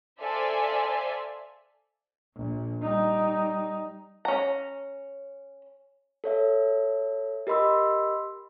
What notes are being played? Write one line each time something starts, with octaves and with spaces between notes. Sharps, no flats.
A4 C5 D5 E5 F5 G#5
A#1
G3 D#4
C#4 A#5
A4 C#5 E5
G4 A#4 D#5 B5 C6 E6